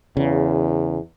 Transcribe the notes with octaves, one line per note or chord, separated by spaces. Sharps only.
E2 C#3